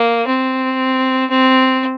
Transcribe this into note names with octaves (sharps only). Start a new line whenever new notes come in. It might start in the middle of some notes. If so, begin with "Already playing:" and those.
Already playing: A#3
C4
C4